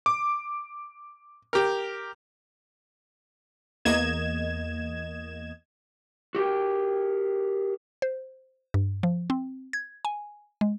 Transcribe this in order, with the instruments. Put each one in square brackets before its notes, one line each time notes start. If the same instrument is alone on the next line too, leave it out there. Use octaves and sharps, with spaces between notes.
[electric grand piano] D6
[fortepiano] G4 A#4
[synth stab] E2 A#3 D#5 G#6 E7
[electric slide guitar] F#4 G4 A#4 G5
[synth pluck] C5
G2
F3
C4
G#6
G#5
G#3